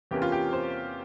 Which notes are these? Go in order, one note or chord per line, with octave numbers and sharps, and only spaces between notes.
E2 C3 E3 A#3 C#4 G4
F4
G4
C5